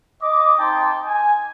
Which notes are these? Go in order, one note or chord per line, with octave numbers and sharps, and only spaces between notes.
D#5 D6
C4 D#4 G5 A5 C6
G#5